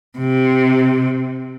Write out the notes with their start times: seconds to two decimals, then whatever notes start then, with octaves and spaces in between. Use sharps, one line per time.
0.19 C3